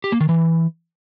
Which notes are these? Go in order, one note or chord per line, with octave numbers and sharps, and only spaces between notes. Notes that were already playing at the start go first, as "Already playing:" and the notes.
G4
A#3
D#3
E3